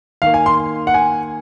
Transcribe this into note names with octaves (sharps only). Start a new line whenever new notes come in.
D#3 A#3 F5
G#5
C6
F#5
G#5